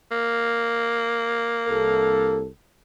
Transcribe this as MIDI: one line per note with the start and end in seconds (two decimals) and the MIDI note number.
0.11 2.40 58
1.69 2.48 36
1.69 2.48 69